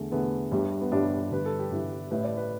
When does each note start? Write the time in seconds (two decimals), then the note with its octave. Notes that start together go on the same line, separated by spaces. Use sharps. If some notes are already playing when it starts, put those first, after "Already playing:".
Already playing: E2 D3 A3
0.12 E2 D3 A3 B3
0.51 G1 G2 G3
0.81 B3
0.92 G1 G2 G3 D4
1.31 G1 G2 D3 B4
1.46 A4
1.59 G4
1.71 G1 G2 D3 E4
2.11 A1 A2 A3 B4
2.24 D5
2.37 B4